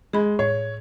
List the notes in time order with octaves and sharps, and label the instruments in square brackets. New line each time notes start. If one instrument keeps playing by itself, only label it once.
[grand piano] G#3 [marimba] G#4 B5
[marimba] A2 [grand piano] C#5